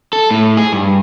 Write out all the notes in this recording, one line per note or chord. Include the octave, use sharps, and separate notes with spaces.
A4
A2
G#4
G2